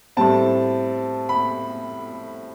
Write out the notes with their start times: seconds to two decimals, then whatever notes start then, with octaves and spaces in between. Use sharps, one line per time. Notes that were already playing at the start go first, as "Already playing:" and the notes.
0.17 A2 G3 C4 A5
1.29 B5